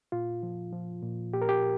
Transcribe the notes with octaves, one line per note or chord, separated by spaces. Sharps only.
A#2 F4
F3
F3
A#2
A#2 G4
A#4
G4